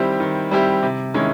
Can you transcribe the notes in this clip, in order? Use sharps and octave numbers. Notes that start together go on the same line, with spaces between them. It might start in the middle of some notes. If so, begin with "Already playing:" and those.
Already playing: D#3 G3 C4 E4 G4
D#3
G3 C4 E4 G4
C3
D#3 G#3 C#4 E4